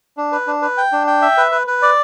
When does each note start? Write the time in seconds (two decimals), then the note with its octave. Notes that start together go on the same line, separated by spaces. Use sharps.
0.17 D4
0.32 B4
0.47 D4
0.62 B4
0.77 G5
0.92 D4
1.07 G5
1.22 E5
1.38 B4
1.52 B4
1.67 B4
1.82 D5